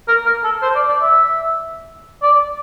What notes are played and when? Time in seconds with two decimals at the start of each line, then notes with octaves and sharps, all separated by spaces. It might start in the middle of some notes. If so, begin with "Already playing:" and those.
0.08 A#4
0.26 A#4
0.44 A4
0.62 C5
0.75 D5
0.89 D5
1.02 E5
2.22 D5